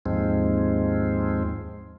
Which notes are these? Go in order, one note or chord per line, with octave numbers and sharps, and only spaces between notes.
D#2 G#2 F3 G#3 C4